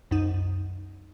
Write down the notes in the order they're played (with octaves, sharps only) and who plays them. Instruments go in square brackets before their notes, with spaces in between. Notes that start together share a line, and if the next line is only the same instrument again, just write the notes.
[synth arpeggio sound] C2 F#2 D#3 D#4